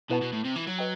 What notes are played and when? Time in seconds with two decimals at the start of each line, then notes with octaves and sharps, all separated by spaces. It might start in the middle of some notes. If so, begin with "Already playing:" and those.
0.10 B2 E4 B4 F#5 A5
0.21 B2
0.32 A2
0.44 C3
0.56 E3
0.67 F#3
0.79 B4 D#5 G5